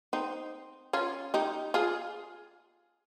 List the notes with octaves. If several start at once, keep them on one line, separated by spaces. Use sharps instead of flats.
C4 D#4
C#4 F4
D#4 G4
F4 G#4